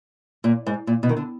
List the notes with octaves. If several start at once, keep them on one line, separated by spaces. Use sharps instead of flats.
A#2
G#2
A#2
B2
D#3
D3